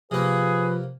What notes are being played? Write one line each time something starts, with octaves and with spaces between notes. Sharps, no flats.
C3 F3 A#3 G#4 B4